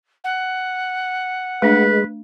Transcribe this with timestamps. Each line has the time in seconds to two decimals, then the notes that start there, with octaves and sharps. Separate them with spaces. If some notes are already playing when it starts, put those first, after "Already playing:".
0.24 F#5
1.62 G#3 A3 D4 B4